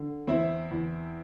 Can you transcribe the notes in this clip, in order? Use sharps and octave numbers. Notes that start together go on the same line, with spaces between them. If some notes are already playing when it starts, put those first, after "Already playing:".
Already playing: D3
E2 C4 E4
E2